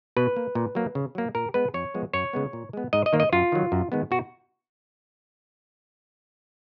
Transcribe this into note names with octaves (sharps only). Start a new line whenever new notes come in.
B2 B4
A#3
A#2
F#3 A#3
C#3
F#3 A#3
A#2 A#4
G#3 B3 B4
F2 C#5
F3 G#3 B3
F#2 C#5
C#3 G#3 B3
A#2
G#3 B3
G#2 D#5
D#5
D#3 A#3
D#5
F#2 F4
D#3 F#3
F#2
D#3 G#3 B3
B2 F#4